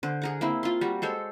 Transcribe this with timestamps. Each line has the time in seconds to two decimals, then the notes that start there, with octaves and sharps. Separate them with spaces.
0.03 D3 C5
0.22 G#4 A#4 F#5
0.41 A#3 C4 E4
0.63 F4 C6
0.81 G3 F#4
1.02 G#3 A4 C5 C#5